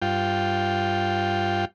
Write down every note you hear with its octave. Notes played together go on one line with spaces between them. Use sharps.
G2 F4 G5